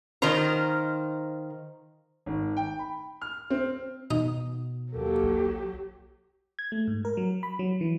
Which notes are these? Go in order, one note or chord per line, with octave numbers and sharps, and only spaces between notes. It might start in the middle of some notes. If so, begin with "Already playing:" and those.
D#3 F4 A#4 C5 A#5
G#1
G5
B5
F6
C4
B2 D#4
D#2 F#3 A#3 G4 A4
B1
G#6
A3
G#2
A#4
F#3
B5
F#3
E3